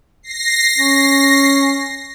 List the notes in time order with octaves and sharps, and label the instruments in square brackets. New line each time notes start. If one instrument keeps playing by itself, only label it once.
[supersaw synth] A#6 C7
[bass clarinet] C#4